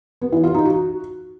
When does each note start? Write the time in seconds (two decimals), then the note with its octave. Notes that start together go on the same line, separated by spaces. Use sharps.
0.21 B3
0.32 E3
0.43 F4
0.54 D#4
0.65 F#4